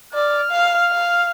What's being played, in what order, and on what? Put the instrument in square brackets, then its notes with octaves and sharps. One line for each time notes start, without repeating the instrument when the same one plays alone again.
[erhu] D5 [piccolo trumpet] F6
[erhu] F5
F5